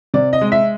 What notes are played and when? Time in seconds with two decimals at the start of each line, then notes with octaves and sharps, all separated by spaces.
0.14 C3 D5
0.33 D#5
0.41 G#3
0.52 E5